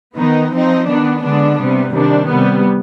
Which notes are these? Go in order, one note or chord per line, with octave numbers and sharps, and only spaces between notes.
D#3 B3 D#4
F3 C4 D#4
D#3 B3 D4
D3 G#3 B3 D4
C3 G3 B3
C3 D#3 G3 D4
C3 G3 B3